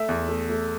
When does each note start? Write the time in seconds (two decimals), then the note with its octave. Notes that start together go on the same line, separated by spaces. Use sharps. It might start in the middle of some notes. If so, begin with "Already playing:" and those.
Already playing: A3 E5
0.09 E2
0.28 A3
0.49 A3